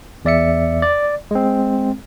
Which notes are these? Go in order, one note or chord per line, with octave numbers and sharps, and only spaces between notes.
E2 D5 E5 C#7
D5
G#3 C4